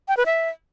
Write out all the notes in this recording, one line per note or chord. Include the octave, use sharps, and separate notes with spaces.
G5
B4
E5